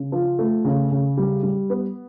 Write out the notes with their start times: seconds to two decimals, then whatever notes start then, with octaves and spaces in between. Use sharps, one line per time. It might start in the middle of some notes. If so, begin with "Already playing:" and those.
Already playing: C#3
0.12 F3
0.39 A3
0.65 C#3
0.91 C#3
1.17 G3
1.43 G3
1.70 B3